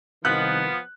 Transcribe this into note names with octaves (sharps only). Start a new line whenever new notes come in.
C2 D#3 F3 B3 F#6